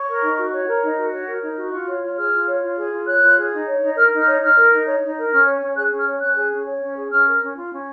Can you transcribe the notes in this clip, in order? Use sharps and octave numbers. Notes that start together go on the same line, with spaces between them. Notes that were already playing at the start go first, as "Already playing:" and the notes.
Already playing: C#5 C#6
A#4
D#4
F#4
C#5
A#4
D#4
F#4
C#5
A#4
D#4
F#4
F4 C#6
C#5
F4
G#4 F6
F4
C#5
F4
G#4
F4
C#5 F#6
F4
G#4
D#4
C#5
D#4
A#4 F6
D#4
F6
C#5
D#4 F6
A#4
D#4
C#5
D#4
A#4
C#4 F6
C#5
C#4
G#4 F#6
C#4
F6
C#5
C#4 F#6
G#4
C#4
C#5
C#4
G#4
C#4 F6
A#4
C#4
F4
C#4